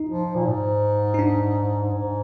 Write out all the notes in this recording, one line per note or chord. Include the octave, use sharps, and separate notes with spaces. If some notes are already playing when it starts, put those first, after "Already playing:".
Already playing: D#4
F3
A#2
G#2
D#4
D4
G#2